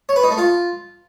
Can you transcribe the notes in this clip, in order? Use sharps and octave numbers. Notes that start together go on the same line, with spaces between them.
C#5
B4
D#4
A3
F4